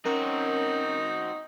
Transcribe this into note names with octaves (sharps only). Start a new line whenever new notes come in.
C4 C#4 D#4 F#4 A#4